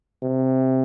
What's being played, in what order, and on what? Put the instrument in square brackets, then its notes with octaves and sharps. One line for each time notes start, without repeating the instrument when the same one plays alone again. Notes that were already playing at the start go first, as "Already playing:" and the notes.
[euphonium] C3